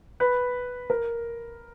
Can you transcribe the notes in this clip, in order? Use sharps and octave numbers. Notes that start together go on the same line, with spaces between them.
B4
A#4